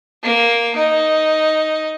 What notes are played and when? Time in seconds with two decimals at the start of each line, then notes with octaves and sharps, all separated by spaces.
0.24 A#3
0.76 D#4